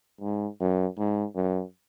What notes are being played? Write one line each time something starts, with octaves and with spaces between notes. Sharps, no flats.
G#2
F#2
G#2
F#2